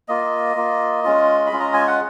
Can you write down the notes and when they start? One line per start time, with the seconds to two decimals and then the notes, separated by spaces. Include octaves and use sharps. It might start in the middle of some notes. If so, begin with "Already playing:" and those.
0.08 A#3 F4 D#5
0.56 A#3 F4
1.04 G#3 C#4 F4
1.46 B5
1.52 G#3 C#4 F4
1.60 A#5
1.74 G#5
1.87 F#5